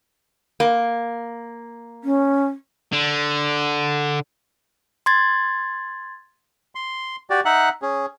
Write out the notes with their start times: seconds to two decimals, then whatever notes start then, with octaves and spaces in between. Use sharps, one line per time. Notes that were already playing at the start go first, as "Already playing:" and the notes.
0.60 A#3
2.04 C#4
2.93 D3
5.06 C6 G#6 A6
6.75 C6
7.30 F#4 G4 D5
7.45 D#4 E5 F#5 F#6
7.82 C#4 G#4